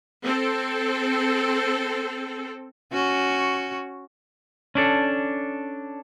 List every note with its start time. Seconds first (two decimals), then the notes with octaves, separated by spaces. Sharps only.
0.22 C4 A4
2.93 C#4 F#4
4.75 C#4 D4 A4